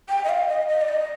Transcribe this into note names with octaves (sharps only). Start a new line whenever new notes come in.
G5
D#5
F5
D#5
D#5
D5
D#5